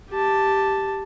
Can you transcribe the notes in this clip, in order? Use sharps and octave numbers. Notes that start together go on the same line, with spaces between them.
G4 A5